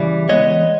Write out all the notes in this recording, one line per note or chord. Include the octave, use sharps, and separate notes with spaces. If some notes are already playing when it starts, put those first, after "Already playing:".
Already playing: C#3 E3 G3 D5 E5
E3 G#3 B3 C#5 D#5